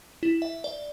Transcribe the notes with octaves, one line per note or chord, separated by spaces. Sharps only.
E4
E5
D5